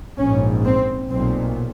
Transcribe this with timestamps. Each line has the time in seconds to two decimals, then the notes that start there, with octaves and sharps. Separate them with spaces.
0.18 A#1 G#2 C#4
0.65 C4
1.11 B1 A#2 C4